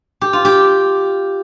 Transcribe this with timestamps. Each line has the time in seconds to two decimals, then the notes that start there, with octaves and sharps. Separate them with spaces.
0.21 G4
0.33 F4
0.45 G4